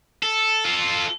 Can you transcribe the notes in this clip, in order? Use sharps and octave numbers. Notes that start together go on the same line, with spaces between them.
A4
F4 A4